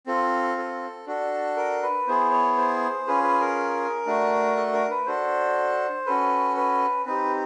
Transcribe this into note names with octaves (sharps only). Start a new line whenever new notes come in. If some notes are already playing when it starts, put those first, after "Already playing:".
C4 F4 A4
A4
D4 F#4 A4
A#4
B4
B3 E4 G#4 C5
C#5
C5
C#4 F4 G#4 B4
B4
A#4
A3 D4 F#4
A4
A#4
B4
D4 F#4 A4 C5
C#4 F#4 A4 B4
B4
C4 D#4 G4 B4